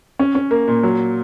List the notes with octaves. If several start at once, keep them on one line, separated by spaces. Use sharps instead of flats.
C#4
C#4
A#3
A#2
F#3